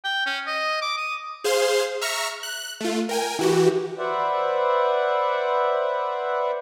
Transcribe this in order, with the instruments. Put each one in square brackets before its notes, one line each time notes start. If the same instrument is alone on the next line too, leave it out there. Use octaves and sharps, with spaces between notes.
[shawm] G5
C#4
D#5
D6
D#6
[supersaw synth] G#4 C5 F5 C6
E5 A#5 C#6 F6
F#6
A3 F4
A#4 G5 G#5
E3 F#4 G4
[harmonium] B4 C5 D5 E5 F#5